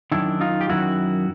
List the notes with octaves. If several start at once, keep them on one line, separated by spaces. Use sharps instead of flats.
F#2 D#3 D4 E4
D#4 F4
G4
F#2 D#3 E4 F#4